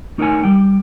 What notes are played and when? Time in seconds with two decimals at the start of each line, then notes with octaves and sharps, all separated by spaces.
0.18 A3 D#4 A#4 C#5 F#5 G#5
0.43 G3 G5